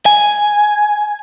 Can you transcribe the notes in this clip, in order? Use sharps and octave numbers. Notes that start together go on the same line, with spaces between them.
G#5